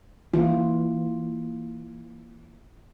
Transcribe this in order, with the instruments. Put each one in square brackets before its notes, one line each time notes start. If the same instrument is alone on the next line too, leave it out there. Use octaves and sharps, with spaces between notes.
[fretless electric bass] E3 [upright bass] A#3 [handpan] F4